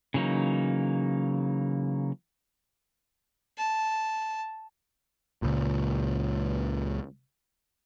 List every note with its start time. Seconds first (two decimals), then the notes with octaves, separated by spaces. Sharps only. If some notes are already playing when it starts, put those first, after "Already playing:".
0.14 C#3 E3 F#3 A#3 D#4
3.57 A5
5.42 C#2 A#2